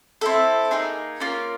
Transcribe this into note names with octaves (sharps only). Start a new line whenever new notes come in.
C4 E4 A4
A#3 D#4 G#4
A#3 C#4 F4 A#4